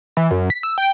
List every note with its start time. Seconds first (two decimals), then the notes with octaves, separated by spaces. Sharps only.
0.17 E3
0.31 F#2
0.50 B6
0.63 E6
0.78 G5